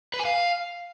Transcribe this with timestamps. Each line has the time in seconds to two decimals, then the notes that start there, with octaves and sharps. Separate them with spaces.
0.14 B4
0.19 G#5
0.25 F5